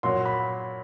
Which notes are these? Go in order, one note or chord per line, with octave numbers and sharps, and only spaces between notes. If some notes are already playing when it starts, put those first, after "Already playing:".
A#2 F#3 C6
B5